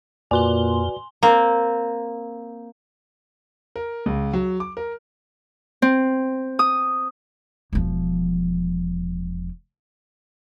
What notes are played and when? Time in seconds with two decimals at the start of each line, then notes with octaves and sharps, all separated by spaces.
0.31 F2 A#2 F#4 B4 D5 G#5 C6 G7
1.23 A#3 C4
3.76 A#4
4.06 C#2
4.33 F#3
4.60 D6
4.77 A#4
5.82 C4
6.59 D#6
7.73 E1 F3